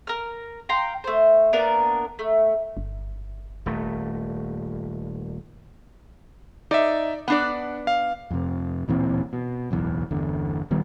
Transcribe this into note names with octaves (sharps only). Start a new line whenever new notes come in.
A#4 F6
F5 G5 A#5 C6
A3 C5
A#3 B3 D4 A#4
A3
G1
D#1 A3
D#4 D5 E5
B3 D4 D5 F#5
F5
F2 C3
D1 A#2 E3 C4
B2
D1 B1 E2
G1 E2 D3
D#1 D#3 G3 B3